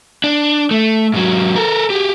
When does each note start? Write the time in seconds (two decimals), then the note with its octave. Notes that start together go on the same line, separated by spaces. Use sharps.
0.24 D4
0.71 A3
1.14 G#2 F#3
1.56 A4 A#4
1.90 G4 G#4